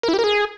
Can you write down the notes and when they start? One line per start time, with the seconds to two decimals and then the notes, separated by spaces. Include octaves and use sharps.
0.03 A#4
0.08 E4
0.14 G4
0.19 A#4
0.24 G#4